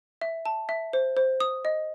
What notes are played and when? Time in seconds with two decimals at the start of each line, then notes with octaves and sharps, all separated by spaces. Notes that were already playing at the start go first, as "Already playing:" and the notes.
0.21 E5
0.46 A5
0.69 E5
0.93 C5
1.17 C5
1.40 D#6
1.65 D#5